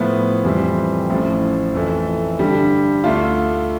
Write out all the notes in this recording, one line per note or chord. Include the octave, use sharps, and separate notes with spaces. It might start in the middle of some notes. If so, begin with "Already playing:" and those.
Already playing: A2 F3 B3
F2 E3 G3 C4
A1 A2 F3
F2 E3 A3
G2 D3 G3
D2 D3 A3 D4 F4